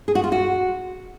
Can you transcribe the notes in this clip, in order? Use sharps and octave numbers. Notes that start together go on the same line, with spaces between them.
G#4
F#4
F4
F#4